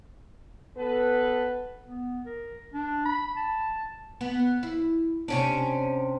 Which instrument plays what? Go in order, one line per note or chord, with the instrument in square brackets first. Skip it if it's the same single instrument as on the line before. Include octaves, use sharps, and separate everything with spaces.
[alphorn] B3 [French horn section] A4 B4
[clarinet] B3
A#4
D4
B5
A5
[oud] B3
E4
C3 C#4 D4